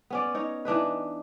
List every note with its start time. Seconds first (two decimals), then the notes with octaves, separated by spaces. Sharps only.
0.10 B3 C#4 D5
0.35 D#4 C#5
0.65 E3 D4 D#4 B4